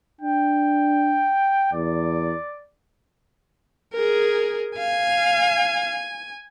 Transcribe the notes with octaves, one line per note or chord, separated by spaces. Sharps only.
D4 G5
E2 D5
G#4 A#4
F5 G#5